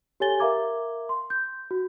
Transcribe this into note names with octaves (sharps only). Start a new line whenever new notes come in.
G4 A4 C#5 G#5 A6 G7
A#4 E5 F5 A#5 D6 G#6
C6
G6
F#4